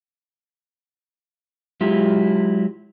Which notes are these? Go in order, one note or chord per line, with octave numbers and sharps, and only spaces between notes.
F#3 G#3 E4 F4 G4